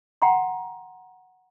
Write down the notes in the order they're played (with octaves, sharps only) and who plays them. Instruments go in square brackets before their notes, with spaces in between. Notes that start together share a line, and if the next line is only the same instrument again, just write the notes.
[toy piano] F#5 G5 A#5 C6